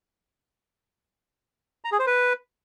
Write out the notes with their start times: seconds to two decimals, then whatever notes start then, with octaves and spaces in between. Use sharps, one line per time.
1.85 A#5
1.92 G#4
1.99 C5
2.07 B4